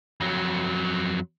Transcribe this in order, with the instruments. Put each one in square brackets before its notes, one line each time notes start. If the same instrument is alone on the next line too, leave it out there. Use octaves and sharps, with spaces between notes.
[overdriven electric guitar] F2 F#3